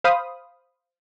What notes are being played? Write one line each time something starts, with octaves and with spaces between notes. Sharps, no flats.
C5 F5 B5 D#6